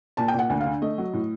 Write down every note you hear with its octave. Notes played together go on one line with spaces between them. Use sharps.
A#2 A5
G5
A#2
F#5
D2 F#5
D3 F5
A3 D#5
F#3
A2